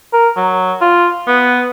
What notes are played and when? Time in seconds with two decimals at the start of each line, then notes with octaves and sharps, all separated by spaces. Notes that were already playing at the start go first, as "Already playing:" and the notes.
0.13 A#4
0.37 F#3
0.81 F4
1.27 B3